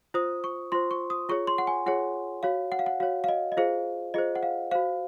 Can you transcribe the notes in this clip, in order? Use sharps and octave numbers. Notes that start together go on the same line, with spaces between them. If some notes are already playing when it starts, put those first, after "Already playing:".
F4 C5 D#6
C#6
F4 C5 C6
C#6
D#6
F4 G#4 C#5 C#6
C6
F#5
G#5
F4 G#4 C#5 F#5
F#4 C#5 F5
F#5
F5
F#5
F#4 C#5 F5
F5
D#5
D#5
F4 G#4 C5 F5
F4 G#4 C5 D#5
F#5
F5
F#4 C5 F5